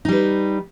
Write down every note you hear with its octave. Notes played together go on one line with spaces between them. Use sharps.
G3 D#4 B4